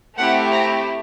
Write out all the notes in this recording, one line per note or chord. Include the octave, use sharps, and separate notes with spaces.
A3 C4 E4 G4 F#5
A#5